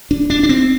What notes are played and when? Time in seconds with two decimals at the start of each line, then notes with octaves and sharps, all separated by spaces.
0.11 D4
0.30 D4
0.43 D4
0.49 C4